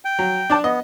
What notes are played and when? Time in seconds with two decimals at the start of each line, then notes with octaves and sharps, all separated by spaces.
0.05 G5
0.19 F#3
0.50 D4 D5 A5
0.64 B3 D#5